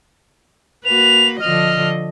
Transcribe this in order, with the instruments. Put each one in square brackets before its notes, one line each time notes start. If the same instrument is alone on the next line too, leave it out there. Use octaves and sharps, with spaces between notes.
[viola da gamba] A#3 F#4 B4 [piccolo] F7
[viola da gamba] D3 F3 D#5 [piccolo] F6